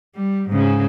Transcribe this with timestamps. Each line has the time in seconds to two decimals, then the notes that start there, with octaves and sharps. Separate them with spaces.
0.16 G3
0.50 G#2 C#3